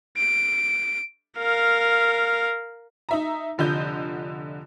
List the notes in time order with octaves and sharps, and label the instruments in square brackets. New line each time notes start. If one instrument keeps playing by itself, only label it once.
[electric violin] D7
A#4 F5
[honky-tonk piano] D#4 E5 A#5
F1 D3 F4 D#5 G6